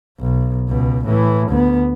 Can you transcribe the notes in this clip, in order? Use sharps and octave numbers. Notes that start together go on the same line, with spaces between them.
B1
C#2 B2
A2 E3
D2 B3